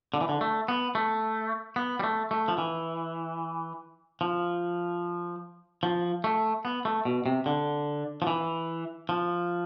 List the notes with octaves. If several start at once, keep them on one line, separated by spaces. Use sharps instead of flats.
D3
E3
D3
A3
B3
A3
B3
G3
A3
A3
F3
E3
F3
F3
A3
B3
A3
B2
C3
D3
F3
E3
F3